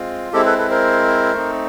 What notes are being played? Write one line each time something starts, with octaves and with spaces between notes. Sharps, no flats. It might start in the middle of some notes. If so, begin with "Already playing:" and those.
Already playing: G#3 C4 F4
G#3 C4 E4 G4 A4
A4 B4
A4 B4
A#4 C5
A3 C4 D#4